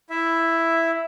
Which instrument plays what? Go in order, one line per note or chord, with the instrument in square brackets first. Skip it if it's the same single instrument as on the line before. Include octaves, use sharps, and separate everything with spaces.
[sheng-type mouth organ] E4 E5